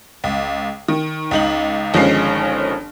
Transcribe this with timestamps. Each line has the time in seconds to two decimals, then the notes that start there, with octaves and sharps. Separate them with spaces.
0.24 C#2
0.88 D#3
1.31 C#2 D#4 F#7
1.94 G1 D#3 F3 G#3 C#4 C7